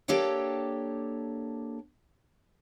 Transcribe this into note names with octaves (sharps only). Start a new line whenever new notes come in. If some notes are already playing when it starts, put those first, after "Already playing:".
A#3 D4 G4 A4 C#5 G5